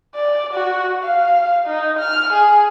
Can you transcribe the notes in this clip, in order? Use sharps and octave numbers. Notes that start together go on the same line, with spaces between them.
D5
F#4
F5
D#4
F6
G#4